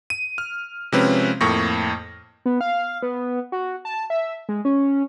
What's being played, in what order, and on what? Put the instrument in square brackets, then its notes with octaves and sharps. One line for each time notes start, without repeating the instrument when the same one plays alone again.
[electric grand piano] D#7
F6
C3 F3 G#3 C4 C#4 B4
F2 A2 A#3 C#6 A#6
[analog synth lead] B3
F5
B3
F#4
A5
E5
G#3
C#4